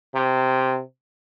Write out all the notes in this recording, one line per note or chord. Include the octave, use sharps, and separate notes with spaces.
C3